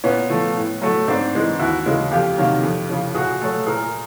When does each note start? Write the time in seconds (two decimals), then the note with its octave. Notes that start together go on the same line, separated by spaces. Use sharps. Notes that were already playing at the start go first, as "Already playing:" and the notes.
0.04 A#2 B3 C#4
0.30 F3 A3
0.56 A2
0.82 F#3 A3
1.08 G#2 C4 D4
1.34 E3 G#3
1.59 D#2 E4 F#4
1.86 C#3 E3 G#3
2.12 F2 F4 G4
2.37 C3 D#3 F#3 A#3
2.63 F2
2.89 C#3 F3
3.15 A#2 F#4 G#4
3.41 F#3 A3
3.66 A#2 G#4 A#4